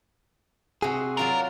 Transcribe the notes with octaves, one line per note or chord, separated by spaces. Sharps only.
C3 F#4 G#4
F#3 F4 A#4 D5